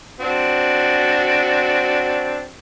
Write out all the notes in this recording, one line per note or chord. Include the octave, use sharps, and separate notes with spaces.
C4 D4 F#4